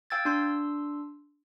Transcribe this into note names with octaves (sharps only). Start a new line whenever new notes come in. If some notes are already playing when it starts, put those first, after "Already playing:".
F5 G5 E6 G#6 A6
D4 C6 E6